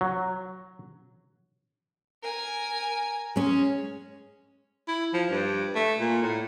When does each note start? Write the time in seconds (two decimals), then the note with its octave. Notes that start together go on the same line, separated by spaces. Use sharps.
0.01 F#3
2.23 A#4 G#5
3.36 G#3 C#4
4.88 E4
5.13 F3
5.30 G2
5.75 A3
5.99 A#2
6.22 A2